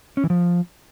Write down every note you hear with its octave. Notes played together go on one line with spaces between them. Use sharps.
C#4
E3
F3